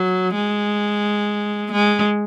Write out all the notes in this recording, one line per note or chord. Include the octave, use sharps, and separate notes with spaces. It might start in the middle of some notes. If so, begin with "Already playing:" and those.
Already playing: F#3
G#3
G#3